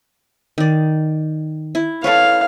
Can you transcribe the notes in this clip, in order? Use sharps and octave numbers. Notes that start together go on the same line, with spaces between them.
D#3 D5
E4
A4 B4 C#5 F5